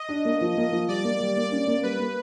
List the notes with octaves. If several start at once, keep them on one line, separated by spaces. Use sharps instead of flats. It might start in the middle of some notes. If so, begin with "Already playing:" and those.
Already playing: D#5
D4
A#3
F3
A#3
F3
G3 D5
A#3
G3
A#3 D5
C#4
A#3
G3 B4
A#3